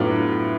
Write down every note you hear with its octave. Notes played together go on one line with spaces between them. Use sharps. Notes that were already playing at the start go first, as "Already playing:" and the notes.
Already playing: A2 F#3 B3 D4 F4